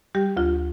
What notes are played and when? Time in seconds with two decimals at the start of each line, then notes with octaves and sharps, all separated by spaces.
0.15 G3 G4
0.37 D2 F4